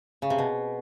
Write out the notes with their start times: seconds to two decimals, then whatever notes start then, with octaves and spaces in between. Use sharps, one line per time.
0.22 C#3
0.30 C3
0.38 B2